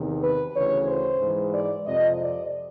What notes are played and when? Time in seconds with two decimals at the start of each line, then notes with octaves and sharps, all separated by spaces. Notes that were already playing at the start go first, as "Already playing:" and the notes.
Already playing: E2 C3 D#3
0.21 B4
0.54 D2 C#3 E3 C#5
0.87 C5
1.20 G#2 E3 G#3
1.53 D5
1.85 F2 C3 F3 D#5
2.19 D5